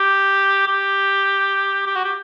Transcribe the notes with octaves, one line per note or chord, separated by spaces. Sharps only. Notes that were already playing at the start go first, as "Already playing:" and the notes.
Already playing: G4
G4
G4
F#4
G4